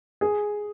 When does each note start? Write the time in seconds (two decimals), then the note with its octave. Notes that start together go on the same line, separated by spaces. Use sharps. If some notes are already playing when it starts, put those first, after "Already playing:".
0.21 G#4